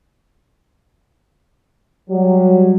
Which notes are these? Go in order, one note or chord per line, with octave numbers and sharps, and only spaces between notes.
F#3 G3